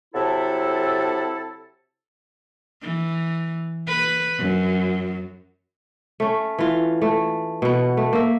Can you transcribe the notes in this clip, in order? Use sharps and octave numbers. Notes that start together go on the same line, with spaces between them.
C3 F#3 E4 A4
E3
B4
F#2
A3 C#4
E3 F4
A3
B2 B3
A3
A#3 E5